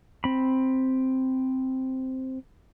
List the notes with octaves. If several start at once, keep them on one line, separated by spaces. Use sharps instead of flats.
C4 B5